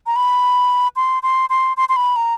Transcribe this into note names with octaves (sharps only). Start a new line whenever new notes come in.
A#5
B5
C6
C6
C6
C6
C6
B5
A#5